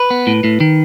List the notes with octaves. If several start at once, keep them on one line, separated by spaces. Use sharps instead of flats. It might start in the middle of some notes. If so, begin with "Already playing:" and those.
Already playing: B4
B3
A2
A2
D#3